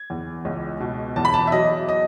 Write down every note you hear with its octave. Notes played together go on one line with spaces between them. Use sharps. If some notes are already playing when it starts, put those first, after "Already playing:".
Already playing: G#6
E2
C#2
B2
E2 A5
B5
A5
E5
F#3 D#5
D#5